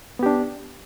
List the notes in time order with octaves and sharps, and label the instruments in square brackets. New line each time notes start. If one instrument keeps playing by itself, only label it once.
[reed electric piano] B3
G4
D4